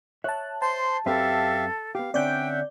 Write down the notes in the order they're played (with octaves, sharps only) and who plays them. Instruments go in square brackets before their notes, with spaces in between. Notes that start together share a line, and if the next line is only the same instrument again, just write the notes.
[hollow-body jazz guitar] C#5 E5 [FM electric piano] A5 F#6
[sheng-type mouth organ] C5 C6 [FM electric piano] A5
[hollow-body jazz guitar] F#2 C4 B4 [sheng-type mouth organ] G4 E5 F5 [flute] A4
[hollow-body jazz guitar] B3 G4 [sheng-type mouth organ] F5
[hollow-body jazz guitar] D3 C4 C#4 [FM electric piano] D5 G6 [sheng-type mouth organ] E5 F#5 [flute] G5